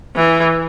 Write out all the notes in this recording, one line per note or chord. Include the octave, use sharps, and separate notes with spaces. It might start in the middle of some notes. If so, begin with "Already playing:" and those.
E3